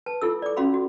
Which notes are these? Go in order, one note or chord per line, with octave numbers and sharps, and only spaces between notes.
B4 A5
E4 F4 A4 E6
D5 D6
C#4 F#4 F5 B5 C6
F#4